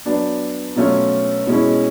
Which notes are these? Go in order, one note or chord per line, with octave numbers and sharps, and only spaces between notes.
F#3 B3 D4
B2 F#3 A3 C#4 F4
B2 G#3 C#4 E4